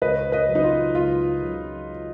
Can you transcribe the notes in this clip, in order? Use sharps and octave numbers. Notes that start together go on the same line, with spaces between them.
C#2 B4 D#5
B4 D#5
C#3 F#3
D#4
F4
C#2 F4
C#3 F#3